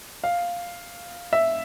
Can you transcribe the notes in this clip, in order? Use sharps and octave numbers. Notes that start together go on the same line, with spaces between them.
F5
E5